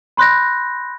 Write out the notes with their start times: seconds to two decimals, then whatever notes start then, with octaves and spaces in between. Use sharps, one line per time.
0.17 B5 C6 F#6 G6 A#6